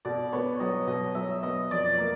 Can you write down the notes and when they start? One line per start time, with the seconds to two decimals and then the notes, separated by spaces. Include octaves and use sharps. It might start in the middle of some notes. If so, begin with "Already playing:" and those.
0.05 B2 D5
0.32 B3 C#5
0.60 F#3 D#5
0.87 B2 D#5
1.15 F#3 E5
1.43 B3 D#5
1.71 F2 D5
1.98 A#3